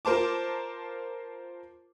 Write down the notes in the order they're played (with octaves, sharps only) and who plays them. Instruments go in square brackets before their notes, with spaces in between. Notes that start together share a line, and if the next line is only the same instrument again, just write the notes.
[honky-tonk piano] F4 A#4 C5 A5 D6